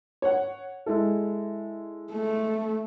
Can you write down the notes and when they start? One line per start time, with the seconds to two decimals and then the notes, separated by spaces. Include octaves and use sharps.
0.22 C#5 F#5
0.86 G#3 E4 A4
2.12 A3